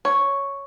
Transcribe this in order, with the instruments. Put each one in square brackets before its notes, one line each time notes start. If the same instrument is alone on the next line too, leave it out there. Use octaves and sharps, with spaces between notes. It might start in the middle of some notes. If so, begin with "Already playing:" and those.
[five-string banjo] C#5